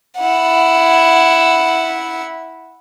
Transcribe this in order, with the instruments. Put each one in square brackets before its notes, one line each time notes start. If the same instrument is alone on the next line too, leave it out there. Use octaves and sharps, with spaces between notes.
[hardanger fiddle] E4 F#5